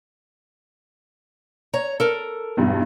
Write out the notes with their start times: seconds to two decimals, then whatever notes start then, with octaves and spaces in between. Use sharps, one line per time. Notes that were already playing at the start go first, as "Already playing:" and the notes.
1.74 C#5 A#5
2.00 A4 A#4
2.57 B1 E2 G2